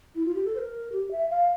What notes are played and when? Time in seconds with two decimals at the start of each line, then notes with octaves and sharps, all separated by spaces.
0.15 E4
0.25 F4
0.34 G4
0.45 A4
0.55 C5
0.58 A#4
0.92 G4
1.11 E5
1.29 F5